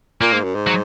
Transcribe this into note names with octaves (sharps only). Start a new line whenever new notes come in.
A#2 A#3
G#2
F#2
G#2
F#3